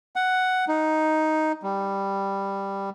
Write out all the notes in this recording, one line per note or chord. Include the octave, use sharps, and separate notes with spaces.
F#5
D#4
G3